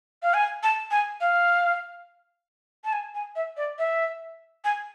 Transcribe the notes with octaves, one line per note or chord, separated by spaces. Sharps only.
F5
G#5
A5
G#5
F5
A5
G#5
G#5
E5
D5
E5
G#5